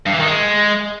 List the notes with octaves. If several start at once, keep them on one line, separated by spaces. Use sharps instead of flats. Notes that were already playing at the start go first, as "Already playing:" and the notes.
G2
E3
D#3
G#3